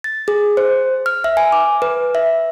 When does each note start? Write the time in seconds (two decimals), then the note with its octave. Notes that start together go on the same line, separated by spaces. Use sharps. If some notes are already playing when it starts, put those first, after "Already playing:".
0.04 A6
0.28 G#4
0.57 C5
1.06 F6
1.24 E5
1.37 G#5
1.52 D6
1.82 B4
2.15 E5